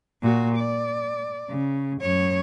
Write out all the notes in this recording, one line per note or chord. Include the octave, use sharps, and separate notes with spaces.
A#2 F#4
D5
C#3
F#2 C#5